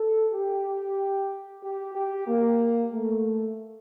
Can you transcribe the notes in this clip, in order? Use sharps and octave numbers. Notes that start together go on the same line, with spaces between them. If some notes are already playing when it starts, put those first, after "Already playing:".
Already playing: A4
G4
G4
G4
A#3
A3